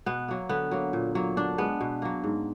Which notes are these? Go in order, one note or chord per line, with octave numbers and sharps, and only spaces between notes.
B2 B3
F#3 A#3
D3 B3
F#3 A#3
A#2
F#3 A#3
D3 D4
G#3 B3
B2
F#3 A#3
G#2